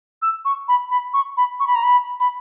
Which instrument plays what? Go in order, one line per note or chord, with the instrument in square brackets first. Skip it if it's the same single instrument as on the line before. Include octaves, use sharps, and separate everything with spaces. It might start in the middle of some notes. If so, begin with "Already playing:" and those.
[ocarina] E6
C#6
B5
B5
C#6
B5
C#6
B5
A#5
B5
B5